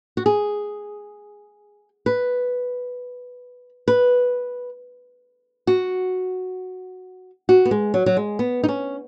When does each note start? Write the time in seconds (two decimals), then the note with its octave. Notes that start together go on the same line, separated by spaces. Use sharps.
0.17 F#4
0.26 G#4
2.06 B4
3.88 B4
5.67 F#4
7.49 F#4
7.65 B3
7.71 G#3
7.94 F#3
8.06 F#3
8.17 G#3
8.39 B3
8.64 D#4
8.68 C#4